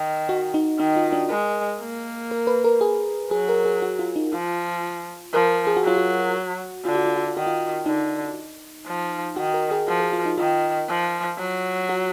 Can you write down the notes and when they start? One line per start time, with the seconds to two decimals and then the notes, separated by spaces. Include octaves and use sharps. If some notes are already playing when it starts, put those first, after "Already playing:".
Already playing: D#3
0.29 F#4
0.54 D#4
0.79 D#3 D#4
0.96 F4
1.12 D4
1.29 G#3 A#4
1.80 A#3
2.31 A#4
2.47 B4
2.64 A#4
2.81 G#4
3.31 F#3 G#4
3.49 A#4
3.65 G#4
3.82 F#4
3.99 F4
4.16 D#4
4.33 F3 F4
5.33 F3 A#4
5.67 G#4
5.77 F#4
5.84 F#3 F4
5.98 F#4
6.85 D3 F4
6.95 F#4
7.06 F4
7.16 F#4
7.26 F4
7.36 D#3 F#4
7.46 F4
7.86 D3 D#4
8.87 F3
9.37 D#3 F#4
9.54 A#4
9.71 G#4
9.88 F3 F#4
10.00 G#4
10.13 F4
10.26 D#4
10.38 D#3 F4
10.89 F3
11.38 F#3
11.89 F#4